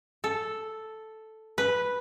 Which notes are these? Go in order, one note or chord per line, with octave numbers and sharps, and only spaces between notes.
A4
B4